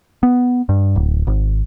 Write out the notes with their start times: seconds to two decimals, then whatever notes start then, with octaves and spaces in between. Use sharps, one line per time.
0.23 B3
0.69 G2
0.96 D1
1.27 G#1